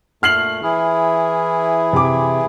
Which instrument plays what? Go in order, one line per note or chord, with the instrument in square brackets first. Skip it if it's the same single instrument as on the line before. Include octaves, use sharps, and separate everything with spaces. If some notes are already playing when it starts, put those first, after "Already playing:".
[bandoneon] A#2 A3 [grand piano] F6 C7 F#7
[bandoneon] E3 E4 G#4
[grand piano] C3 D6